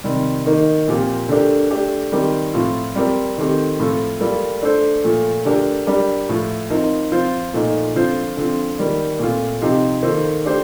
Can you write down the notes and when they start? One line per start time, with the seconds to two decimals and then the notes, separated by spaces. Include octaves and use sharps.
0.04 C3 D#3 G3 C4
0.46 D#3 A#3 D#4
0.88 A#2 F3 C4 G4 A#4
1.29 D3 A3 D4 G4 A#4
1.71 A3 D4 G4
2.12 D#3 G3 C4 G4 A#4
2.54 A2 F3 C4 F4
2.95 G3 C4 G4 A#4
3.38 D#3 A3 C4 G4
3.79 A2 F3 C4 F4 A4
4.20 G3 A#3 F4 A4
4.62 A3 D4 A4 C5
5.04 A#2 F3 A3
5.45 D3 A3 D4 G4 A#4
5.87 G3 D4 G4 A#4
6.29 A2 F3 A3
6.70 F3 C4 D#4 A#4
7.12 F3 C4 F4 C5
7.54 A#2 F3 A3 D#4
7.95 D3 F3 C4 F4 C5
8.37 D3 F3 C4
8.78 D#3 G3 A#3
9.19 A#2 A3 C4 F4
9.61 C3 F3 C4 D#4 G4
10.03 D#3 A#3 F4 A4 C5
10.45 A3 D4 G4 C5